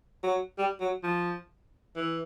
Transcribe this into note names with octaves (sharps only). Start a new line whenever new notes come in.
F#3
G3
F#3
F3
E3